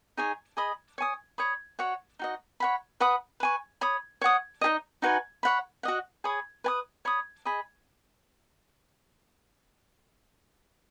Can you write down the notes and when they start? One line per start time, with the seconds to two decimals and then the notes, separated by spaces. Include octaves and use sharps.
0.17 D#4 G#4 C#5 G#5
0.57 G#4 D#5 B5 D#6
0.98 C#5 G#5 D#6
1.38 C#5 B5 D#6
1.79 F#4 C#5 F#5
2.19 D#4 F#4 D#5
2.60 C#5 F#5 B5
3.00 B4 F#5 B5 D#6
3.40 B4 G#5 C#6
3.81 C#5 B5 D#6
4.21 C#5 F#5 D#6
4.61 D#4 G#4 D#5
5.02 D#4 F#4 B4 G#5
5.43 C#5 F#5 B5
5.83 F#4 D#5 F#5
6.24 G#4 C#5 B5 D#6
6.64 B4 G#5 D#6
7.05 C#5 B5 D#6
7.45 G#4 D#5 B5